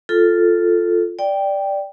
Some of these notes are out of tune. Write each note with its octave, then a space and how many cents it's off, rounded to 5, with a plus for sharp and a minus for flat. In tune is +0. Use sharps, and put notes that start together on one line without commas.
F4 +0 A4 +0
D5 +0 G5 +0